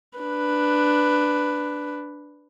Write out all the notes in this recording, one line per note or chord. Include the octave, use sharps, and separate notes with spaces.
D4 B4